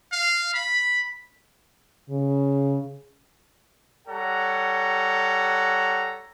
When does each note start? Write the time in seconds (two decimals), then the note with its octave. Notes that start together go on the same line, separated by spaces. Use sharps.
0.12 F5
0.54 B5
2.10 C#3
4.07 G3 A4 C#5 F#5 A#5